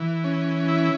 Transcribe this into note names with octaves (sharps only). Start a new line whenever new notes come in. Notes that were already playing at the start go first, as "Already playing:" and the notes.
Already playing: E3
C#4
E4